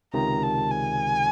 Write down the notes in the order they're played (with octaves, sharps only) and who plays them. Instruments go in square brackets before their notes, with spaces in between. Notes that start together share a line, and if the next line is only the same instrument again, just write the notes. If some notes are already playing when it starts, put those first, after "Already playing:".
[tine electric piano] C#2 C3 D#3 [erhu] A#5
[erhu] A5
G#5